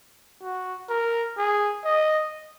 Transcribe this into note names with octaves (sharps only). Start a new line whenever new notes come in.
F#4
A#4
G#4
D#5